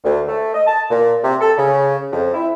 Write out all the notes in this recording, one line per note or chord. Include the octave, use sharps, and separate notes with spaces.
D2
A3
D#5
A5
A#2
C3
A4
C#3
F2
E4